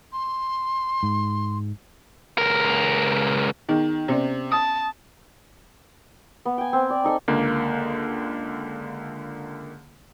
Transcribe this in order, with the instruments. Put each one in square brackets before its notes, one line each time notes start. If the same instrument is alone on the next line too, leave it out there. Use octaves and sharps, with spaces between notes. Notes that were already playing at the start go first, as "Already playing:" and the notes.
[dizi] C6
[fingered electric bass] G#2
[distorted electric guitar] C#2 A#4
[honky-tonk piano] D#3 [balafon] B3 D#4 G#4
[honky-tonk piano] C3 [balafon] B3 C#4 D5
[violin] A5 [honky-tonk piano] D#6
[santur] B3
G5 G#5
C4
D5
D#4 A4 G#5
[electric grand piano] C#2 D3 A#3